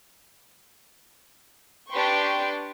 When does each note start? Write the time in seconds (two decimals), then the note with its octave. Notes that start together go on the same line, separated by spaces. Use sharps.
1.91 D4 G4 B4 G5 C6 C#6